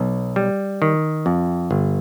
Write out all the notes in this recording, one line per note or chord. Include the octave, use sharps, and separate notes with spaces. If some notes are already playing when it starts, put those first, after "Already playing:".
Already playing: B1
G3
D#3
F2
G1